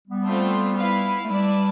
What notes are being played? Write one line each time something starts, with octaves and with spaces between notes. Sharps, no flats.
G3 B3
A3 C4 F4
E4 B4 F5
A3
G3 E4 B4 D5 A5